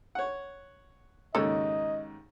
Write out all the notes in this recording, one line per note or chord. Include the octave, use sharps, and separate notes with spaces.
C#5 F#5
D#2 G#2 C#3 A4 C#5 D#5